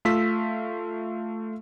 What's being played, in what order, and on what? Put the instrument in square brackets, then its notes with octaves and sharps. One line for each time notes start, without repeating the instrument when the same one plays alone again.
[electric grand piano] A3 F4 E6 B6